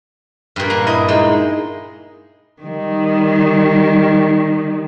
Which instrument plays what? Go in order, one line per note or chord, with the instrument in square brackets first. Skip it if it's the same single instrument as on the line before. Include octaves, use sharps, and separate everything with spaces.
[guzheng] G2 A#2
A#3
[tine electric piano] E4 D#6 [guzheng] D#5
[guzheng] G#3 [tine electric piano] D#4 E4
[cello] D#3 G3